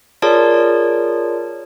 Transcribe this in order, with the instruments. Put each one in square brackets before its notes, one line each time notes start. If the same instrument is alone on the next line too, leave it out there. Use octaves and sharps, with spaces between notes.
[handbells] F4 G#4 A#4 C#5 D5 A5